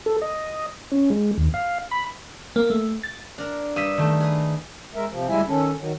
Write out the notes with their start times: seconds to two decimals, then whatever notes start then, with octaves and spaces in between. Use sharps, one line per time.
0.06 A4
0.22 D#5
0.92 C#4
1.10 G#3
1.38 D#2
1.54 F5
1.91 B5
2.56 A#3
2.70 A3
3.03 A6
3.38 D4 A#4
3.76 G2 D#6 E6 B6
3.98 D#3 A3
4.20 G#4 B4
4.95 G#3 A#4 E5
5.10 C3 F3
5.29 D2 G3 G#3 E4 E5 G#5
5.47 D#3 C#4 A4
5.79 D#3 F#3